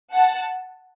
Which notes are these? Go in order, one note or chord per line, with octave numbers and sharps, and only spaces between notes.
F#5 A5